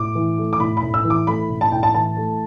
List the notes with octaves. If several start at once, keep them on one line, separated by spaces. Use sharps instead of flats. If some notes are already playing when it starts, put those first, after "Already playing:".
Already playing: A2 D6
E3
A3
D6
A2 B5
B5
A2
E6
E3
D6
A3 B5
A2
A5
A2 G5
A5
E3 A5
A3